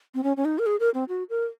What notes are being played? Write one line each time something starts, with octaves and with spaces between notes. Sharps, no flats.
C4
C#4
C#4
D#4
A#4
G#4
A#4
C4
F#4
A#4